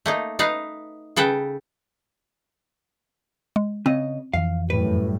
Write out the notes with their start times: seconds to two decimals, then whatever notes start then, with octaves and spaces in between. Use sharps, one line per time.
0.06 A3 A#3 D#4
0.39 D#4 B4 F5
1.16 C#3 A4 B4 G5
3.56 G#3
3.86 C#3 C4 D#5
4.34 F2 E3 F5
4.70 F#2 A2 G3 B4